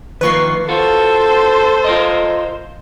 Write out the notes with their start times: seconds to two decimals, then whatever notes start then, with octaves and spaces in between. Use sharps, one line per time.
0.21 D#3 F3 A#3 B4 C#6 C7
0.69 F4 F#4 A4 C5
1.84 F4 A#4 D#5